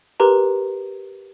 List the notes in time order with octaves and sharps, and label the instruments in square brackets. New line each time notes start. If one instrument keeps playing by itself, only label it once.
[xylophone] G4 A#4 B4 A#5 C6